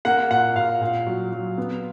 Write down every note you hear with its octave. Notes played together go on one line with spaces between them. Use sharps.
A#3 F#5
A#2 F#5
A#2 F5
A#2
F#3
F#3
B3